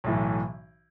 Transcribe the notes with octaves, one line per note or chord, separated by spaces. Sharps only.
B1 A2 E3